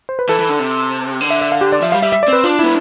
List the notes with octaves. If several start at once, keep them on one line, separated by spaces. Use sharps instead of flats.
C5
B4
E3 A4
E3
D3
C3
D3
E5
E5
F5
G4
D5
F3 E5
G3 F5
G3 E5
E5
D5
C4 B4
D4 F4
B3 E4